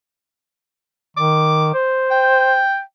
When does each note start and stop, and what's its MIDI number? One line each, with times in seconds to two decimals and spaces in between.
1.17 1.71 51
1.17 1.74 86
1.74 2.61 72
2.11 2.81 79